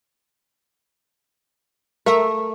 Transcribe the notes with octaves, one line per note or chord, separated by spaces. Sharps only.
A3 A#4 E5